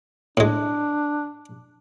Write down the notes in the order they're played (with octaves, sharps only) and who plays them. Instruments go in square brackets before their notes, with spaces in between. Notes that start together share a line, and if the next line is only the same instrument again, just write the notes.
[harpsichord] A2 G#3 [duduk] D4